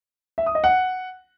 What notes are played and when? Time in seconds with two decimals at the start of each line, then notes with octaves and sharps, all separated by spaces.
0.38 E5
0.46 D#6
0.55 D#5
0.64 F#5